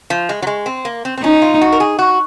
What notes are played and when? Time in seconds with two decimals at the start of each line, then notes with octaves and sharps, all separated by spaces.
0.10 F3
0.29 G#3
0.42 F#3
0.47 G#3
0.66 C4
0.85 A#3
1.05 C4
1.17 C4
1.23 C#4 D#4
1.42 F4
1.61 F#4
1.72 A#4
1.80 G#4
1.99 F#4